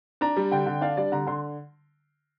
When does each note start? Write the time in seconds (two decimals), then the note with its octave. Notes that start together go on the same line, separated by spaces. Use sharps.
0.21 D4 A#5
0.36 G3
0.51 D3 G5
0.66 D3
0.81 D4 F5
0.97 G3 D5
1.12 D3 A#5
1.27 D3 C6